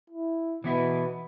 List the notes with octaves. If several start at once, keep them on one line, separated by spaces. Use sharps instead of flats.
E4
B2 E3 B3 E4